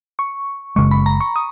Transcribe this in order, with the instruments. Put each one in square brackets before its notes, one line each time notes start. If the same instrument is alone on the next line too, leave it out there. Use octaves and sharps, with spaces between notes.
[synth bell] C#6
[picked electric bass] F#1 E2 C#3 G#3 [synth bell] C#6
[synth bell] B5
A#5
C#6
D#6